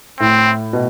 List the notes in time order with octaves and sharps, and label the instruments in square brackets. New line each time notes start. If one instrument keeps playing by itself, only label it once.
[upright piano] A2 [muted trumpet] C4
[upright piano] B2